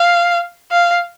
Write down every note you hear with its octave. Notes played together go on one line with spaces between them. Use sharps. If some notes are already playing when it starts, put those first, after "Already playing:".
Already playing: F5
F5